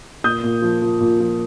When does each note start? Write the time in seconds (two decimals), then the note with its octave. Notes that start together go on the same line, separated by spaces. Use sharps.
0.24 A#2 D#6 G6
0.43 A#2
0.62 F3
0.82 F3
1.01 A#2
1.20 F3